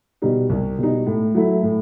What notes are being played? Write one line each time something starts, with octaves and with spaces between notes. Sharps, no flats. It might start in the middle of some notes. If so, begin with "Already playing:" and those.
B2 G3 D#4
C2
B2 G3 D#4
A2
F#3 A3 E4
A2